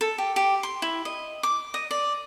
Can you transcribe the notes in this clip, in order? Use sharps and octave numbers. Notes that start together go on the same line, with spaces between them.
A4
G4
G4
C6
E4
D#5
D6
D#5
D5